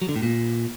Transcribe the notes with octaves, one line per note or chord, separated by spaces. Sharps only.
F#3
D3
A2
A#2